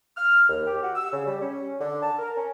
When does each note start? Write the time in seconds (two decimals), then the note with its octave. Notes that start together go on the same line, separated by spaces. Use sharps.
0.16 F6
0.49 D#2
0.67 G4
0.82 F#4
0.96 E6
1.13 C#3
1.26 G3
1.41 C#4
1.80 D3
2.03 A5
2.19 A#4
2.36 C#4